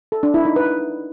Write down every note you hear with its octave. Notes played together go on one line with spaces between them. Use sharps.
A4
D4
E4
D#4
B4